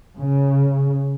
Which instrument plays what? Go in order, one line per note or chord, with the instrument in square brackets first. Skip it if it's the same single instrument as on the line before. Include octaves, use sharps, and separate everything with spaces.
[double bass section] C#3